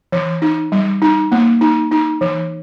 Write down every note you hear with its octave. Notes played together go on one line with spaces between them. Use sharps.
E3
D#4
G3
D#4
A#3
D#4
D#4
E3